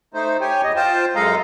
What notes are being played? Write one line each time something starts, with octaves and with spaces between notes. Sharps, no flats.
A3 D#4 C5
G4 C#5 G5 G#5
E2 D#5
F4 C5 G5 A5
F#2 G#3 A4 D#5 F5 A#5